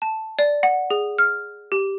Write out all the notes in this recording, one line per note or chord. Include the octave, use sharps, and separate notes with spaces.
A5
D5
F#5
G#4
F6
G4